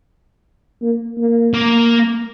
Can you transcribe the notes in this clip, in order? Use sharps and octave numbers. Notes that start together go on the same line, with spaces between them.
A#3
A#3
A#3